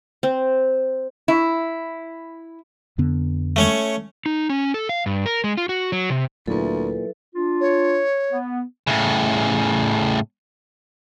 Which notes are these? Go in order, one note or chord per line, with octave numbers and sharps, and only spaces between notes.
C4
E4
F2 D3 B3
A3 C#4 C#5
D#4
C#4
A4
F5
G2
A#4
G#3
F4
F#4
F#3
C3
D2 A#2 F#3 E4 A4 B4
D4 F4
C#5
B3
A2 C#3